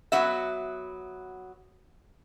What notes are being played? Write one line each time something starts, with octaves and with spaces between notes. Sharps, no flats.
F#3 B3 F#4 E5